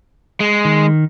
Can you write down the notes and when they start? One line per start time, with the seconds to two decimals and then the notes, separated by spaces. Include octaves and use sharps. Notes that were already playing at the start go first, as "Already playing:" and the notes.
0.40 G#3
0.65 D#3